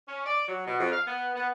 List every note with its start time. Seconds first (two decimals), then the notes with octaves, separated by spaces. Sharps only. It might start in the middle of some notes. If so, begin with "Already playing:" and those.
0.08 C#4
0.25 D5
0.48 F#3
0.66 B2
0.80 F2
0.91 F5
1.06 B3
1.34 B3